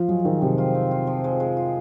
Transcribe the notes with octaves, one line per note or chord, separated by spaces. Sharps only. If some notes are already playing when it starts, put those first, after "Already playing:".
Already playing: F3 F4
F#3 G#3
D#3 C4
C3 F3
F4
C4
F4
F3
G#3
G#3
F4